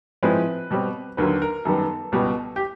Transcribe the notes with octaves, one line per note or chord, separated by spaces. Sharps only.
A2 F3 G#3 C4 B4
B2 G3 C4
D#2 D3 F#3 A#3 B4
A#4
F#2 D#3 G3 B3 A4
C#2 B2 G3 B3
G4